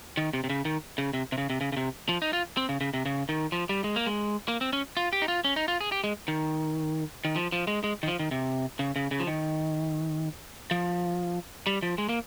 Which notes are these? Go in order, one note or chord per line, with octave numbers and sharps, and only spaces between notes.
D#3
C3
C3
C#3
D#3
C#3
C3
C3
C#3
C3
C#3
C#3
C3
F3
D#4
F4
C4
C#3
C#3
C3
C#3
D#3
F3
G3
G#3
A#3
G#3
A#3
C4
C#4
F4
G4
D#4
F4
C#4
D#4
F4
G#4
G4
G#3
D#3
D#3
F3
F3
G#3
G#3
D#3
F3
D#3
C3
C#3
C#3
C#3
F3
D#3
F3
G3
F3
G#3
A#3